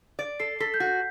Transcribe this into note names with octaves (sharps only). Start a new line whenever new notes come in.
D5
A4 C7
A4 B6
G6
F#4
G6